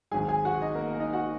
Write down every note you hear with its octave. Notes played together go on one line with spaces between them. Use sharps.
G#1 G#2 F#3 G#4 G#5
G#4 G#5
F#4 F#5
D#4 D#5
A#3 A#4
A#3 A#4
D#4 D#5
F#4 F#5